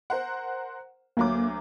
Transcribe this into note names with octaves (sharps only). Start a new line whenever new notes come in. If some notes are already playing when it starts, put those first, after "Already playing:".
A#4 C5 F#5
D2 F#3 A#3 D6